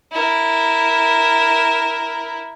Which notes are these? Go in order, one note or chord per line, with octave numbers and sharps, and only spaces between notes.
E4 A#4